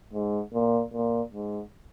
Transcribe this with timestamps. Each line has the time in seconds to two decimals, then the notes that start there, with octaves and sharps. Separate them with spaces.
0.13 G#2
0.54 A#2
0.94 A#2
1.33 G#2